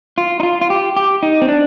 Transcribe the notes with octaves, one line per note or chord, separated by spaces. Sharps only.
F4
D#4
F4
F4
G4
G4
D#4
C4
D4